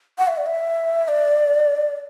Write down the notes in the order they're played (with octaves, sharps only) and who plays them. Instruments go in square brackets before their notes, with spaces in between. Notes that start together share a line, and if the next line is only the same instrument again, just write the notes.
[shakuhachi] F#5
E5
D5
E5
D5